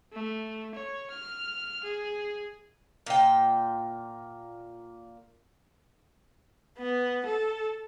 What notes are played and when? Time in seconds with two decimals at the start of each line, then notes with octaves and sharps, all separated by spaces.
0.13 A3
0.75 C#5
1.11 F6
1.84 G#4
3.06 A#2 G5
6.78 B3
7.26 A4